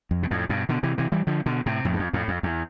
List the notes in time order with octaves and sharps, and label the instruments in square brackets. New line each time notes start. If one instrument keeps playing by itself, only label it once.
[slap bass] F2
B2
F2 A2
G2 B2
B2 D3
C3 E3
C3 E3
E3 G3
D3 F3
B2 D3
A2 C3
F2 A2
G2
F2
F2 A2
F2
E2